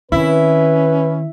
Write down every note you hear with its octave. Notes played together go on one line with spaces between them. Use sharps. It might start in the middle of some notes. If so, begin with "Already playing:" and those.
D#3 C4 C#4 E4 B4